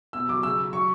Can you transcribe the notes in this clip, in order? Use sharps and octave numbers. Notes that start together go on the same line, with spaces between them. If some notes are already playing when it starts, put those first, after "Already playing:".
B2 E6
F#3 D6
C#3 E6
F#3
F#3 C#6